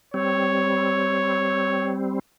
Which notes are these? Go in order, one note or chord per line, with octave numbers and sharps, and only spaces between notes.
G3 C4 C#5